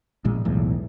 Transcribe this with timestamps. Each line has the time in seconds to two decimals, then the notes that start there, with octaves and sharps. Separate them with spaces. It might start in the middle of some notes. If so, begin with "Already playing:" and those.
0.25 A#1 A#2 G#3
0.45 B1 E2 A2